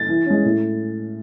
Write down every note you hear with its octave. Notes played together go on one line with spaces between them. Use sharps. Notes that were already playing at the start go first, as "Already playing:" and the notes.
Already playing: A6
E3
G#3 C#4
A2